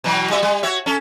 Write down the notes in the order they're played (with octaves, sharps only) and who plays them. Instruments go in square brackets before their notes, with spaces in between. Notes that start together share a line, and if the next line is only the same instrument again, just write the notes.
[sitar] B2 E3 F#3
G3 F#4 E5
G3
F#4 C#5 E5
C#4 A4